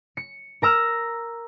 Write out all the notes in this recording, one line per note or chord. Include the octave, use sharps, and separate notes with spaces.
C#7
A#4 A#5 E6 F6